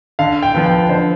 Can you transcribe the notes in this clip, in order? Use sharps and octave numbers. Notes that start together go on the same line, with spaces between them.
D3 F5
G5
F3 B3
G5
D3 C5